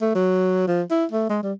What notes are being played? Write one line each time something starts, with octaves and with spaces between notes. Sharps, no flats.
A3
F#3
F3
E4
A3
G#3
G3